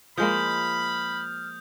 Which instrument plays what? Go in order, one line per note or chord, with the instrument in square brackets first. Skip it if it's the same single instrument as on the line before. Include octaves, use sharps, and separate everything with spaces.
[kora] F3 G#3 A#3 [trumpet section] B5 [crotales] D#6 G6 [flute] F6